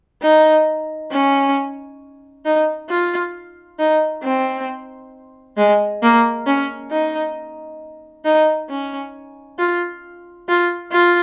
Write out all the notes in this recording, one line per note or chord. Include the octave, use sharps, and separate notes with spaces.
D#4
C#4
D#4
F4
D#4
C4
G#3
A#3
C#4
D#4
D#4
C#4
F4
F4
F4